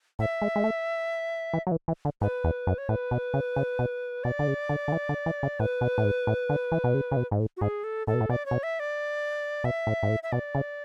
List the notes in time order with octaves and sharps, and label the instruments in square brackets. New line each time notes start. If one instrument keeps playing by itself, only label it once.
[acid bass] A2 [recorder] E5
[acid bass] G#3
G#3
A3
E3
F#3
E3
E3
D3
[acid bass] G#2 [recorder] B4
[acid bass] E2
F#2
[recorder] C#5
[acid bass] A2 [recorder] B4
[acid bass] B2
C#3
C#3
B2
[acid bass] B2 [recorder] D5
[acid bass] D3
C#3
D3
D3
E3
D3
E3
C#3
[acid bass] A2 [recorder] B4
[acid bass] B2
A2
G#2
A2
D3
E3
B2
C#3
C#3
B2
G#2
A2
[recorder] F#4
[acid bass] G#2 [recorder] G#4
[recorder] A4
[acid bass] A2 [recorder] A4
[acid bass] B2
A2
[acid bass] B2 [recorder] D5
[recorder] C#5
[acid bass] B2
[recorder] E5
D5
[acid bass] B2 [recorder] E5
[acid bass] A2
G#2
A2
[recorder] E5
[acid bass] B2 [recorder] D5
[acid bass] C#3